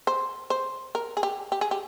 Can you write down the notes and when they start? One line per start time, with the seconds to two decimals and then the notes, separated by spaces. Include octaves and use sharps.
0.07 C5
0.50 C5
0.95 A#4
1.17 G#4
1.23 G4
1.52 G4
1.61 G#4
1.71 G4